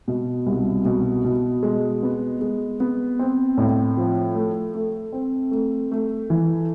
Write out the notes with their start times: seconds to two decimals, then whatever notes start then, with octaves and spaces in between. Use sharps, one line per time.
0.08 B2
0.46 C2
0.85 B2
1.24 B2
1.63 G#3
2.03 B3
2.41 G#3
2.80 B3
3.19 C4
3.58 A2
3.97 F3
4.35 A3
4.74 A3
5.13 C4
5.51 A3
5.91 A3
6.30 E3